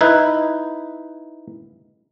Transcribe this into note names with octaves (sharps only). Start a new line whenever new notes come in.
D#4 E4 B4